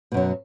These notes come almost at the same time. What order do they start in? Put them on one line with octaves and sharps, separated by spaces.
B2 F#2 F#3